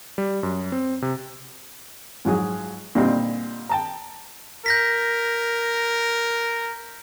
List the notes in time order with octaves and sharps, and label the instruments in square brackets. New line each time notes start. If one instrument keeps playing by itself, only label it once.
[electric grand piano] G3
F#2
C4
C3
[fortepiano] G#2 F3 F#3 G#4
A#2 D3 G3 C4 D#4
G5 A5 A#5
[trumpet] A#4 [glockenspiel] G6 A#6 B6